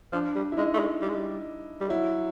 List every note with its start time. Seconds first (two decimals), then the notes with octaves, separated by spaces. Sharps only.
0.12 F3 D4
0.35 G3
0.52 E4
0.57 G#3 D#4
0.74 A3
0.79 G#3
1.02 G3
1.09 G#3
1.15 G3
1.81 G3
1.89 F#3 E4